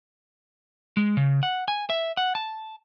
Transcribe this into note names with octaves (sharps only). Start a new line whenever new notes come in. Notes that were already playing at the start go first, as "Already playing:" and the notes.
G#3
C#3
F#5
G#5
E5
F#5
A5